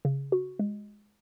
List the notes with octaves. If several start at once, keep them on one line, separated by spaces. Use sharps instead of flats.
C#3
F#4
G#3